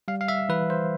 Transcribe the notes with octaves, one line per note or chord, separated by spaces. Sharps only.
G3 F5
F5
E5
E3 B4
C5